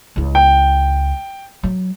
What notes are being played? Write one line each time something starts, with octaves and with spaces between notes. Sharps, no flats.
C#2 E4
G5
F#3